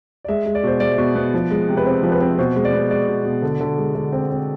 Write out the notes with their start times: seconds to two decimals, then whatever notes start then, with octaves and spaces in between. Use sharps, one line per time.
0.25 D5
0.28 G#3 E5
0.46 G#3
0.55 D5
0.63 B2 C5
0.80 G#3 D5
0.98 B2
1.15 B3
1.34 F3
1.51 G#3
1.68 C3
1.77 B4
1.86 C4 C5
2.03 F3
2.12 B4
2.20 C4
2.38 B2 C5
2.56 G#3
2.65 D5
2.73 B3
2.90 G#3 D5
3.09 B2
3.25 B2
3.42 D3
3.61 D3
3.78 G#3
3.95 D3
4.12 C4
4.31 C4